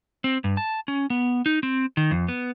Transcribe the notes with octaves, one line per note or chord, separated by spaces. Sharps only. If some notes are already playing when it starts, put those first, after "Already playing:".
C4
G2
A5
C#4
B3
D#4
C4
D#3
F2
B3